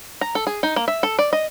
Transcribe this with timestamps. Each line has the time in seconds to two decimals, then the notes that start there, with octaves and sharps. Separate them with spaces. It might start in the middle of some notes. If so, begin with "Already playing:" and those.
0.21 A#5
0.35 A4
0.47 G#4
0.63 D#4
0.76 A#3
0.88 E5
1.03 A4
1.19 D5
1.33 D#5